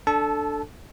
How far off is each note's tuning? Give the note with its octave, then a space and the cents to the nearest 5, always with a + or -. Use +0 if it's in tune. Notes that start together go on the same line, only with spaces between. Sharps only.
D4 +0 A4 +0 A5 -25